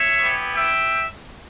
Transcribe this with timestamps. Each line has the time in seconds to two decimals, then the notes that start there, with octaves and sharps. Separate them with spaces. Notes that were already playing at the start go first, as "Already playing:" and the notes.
Already playing: C#5 E5
0.20 B3 E4 G4
0.55 E5 G5